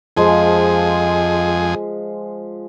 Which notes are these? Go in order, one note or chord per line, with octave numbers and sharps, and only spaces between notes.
F2 F3 G#3 G#4 C5